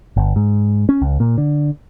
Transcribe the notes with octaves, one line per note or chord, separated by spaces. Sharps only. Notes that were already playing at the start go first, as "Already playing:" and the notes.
G1
G#2
C#4
C#2
A#2
D3